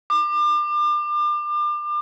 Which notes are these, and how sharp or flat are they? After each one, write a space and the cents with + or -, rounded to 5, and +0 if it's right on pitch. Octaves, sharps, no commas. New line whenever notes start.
D6 +35